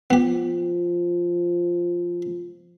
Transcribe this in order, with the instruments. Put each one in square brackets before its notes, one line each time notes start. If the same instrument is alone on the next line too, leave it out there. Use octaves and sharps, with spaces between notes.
[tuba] F3 [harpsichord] B3 G4